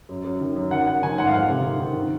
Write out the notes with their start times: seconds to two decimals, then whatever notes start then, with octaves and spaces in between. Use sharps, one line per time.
0.09 F#2
0.24 F#2
0.40 D#3
0.56 F#2
0.71 D#3 F#5
0.87 D#3 F#5
1.02 D#3 G#5
1.17 G#2 F#5
1.27 F5
1.33 F2 F#5
1.49 C3
1.64 D#3
1.80 D#3
1.96 D#3